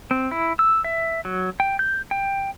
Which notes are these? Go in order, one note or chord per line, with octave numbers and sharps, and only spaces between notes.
C4
E4
E6
E5
F#3
G5
G6
G5